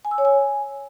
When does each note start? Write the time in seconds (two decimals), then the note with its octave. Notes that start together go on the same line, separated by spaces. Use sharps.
0.05 G#5
0.11 E6
0.18 C#5
0.25 G#5